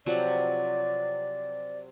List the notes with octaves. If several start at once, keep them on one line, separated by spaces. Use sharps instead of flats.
C3 F3 F#3 D5